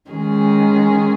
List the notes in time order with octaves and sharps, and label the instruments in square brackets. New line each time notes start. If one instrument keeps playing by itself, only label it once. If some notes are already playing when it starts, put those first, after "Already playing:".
[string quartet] D#3 G#3 C#4 G#4